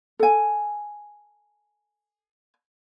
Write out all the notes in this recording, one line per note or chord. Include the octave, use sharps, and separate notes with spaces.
A4 G#5